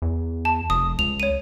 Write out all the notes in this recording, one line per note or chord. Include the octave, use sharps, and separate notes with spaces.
E2
A5
F1 D#6
C#2 F7
C#5 D#7